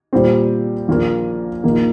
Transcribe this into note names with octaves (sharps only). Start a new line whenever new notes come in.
A#2 G3 C4
A#1 A#2 A#3 F4
A#1 A#2 A#3 D#4